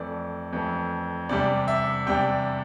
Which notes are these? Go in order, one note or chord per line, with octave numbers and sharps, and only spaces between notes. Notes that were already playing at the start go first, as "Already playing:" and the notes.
Already playing: F2 E3 A3 D5
F2 E3 A3
E2 C3 G3 D4 D5
E5
E2 C3 G3 D4 G5